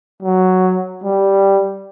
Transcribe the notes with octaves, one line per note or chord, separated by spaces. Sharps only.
F#3
G3